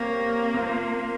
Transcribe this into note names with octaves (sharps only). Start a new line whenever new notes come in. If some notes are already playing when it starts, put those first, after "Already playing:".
Already playing: A#3 C4 G4 C#5
C4 F4 C5